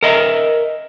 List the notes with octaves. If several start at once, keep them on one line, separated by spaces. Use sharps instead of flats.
A#4 D#5 E5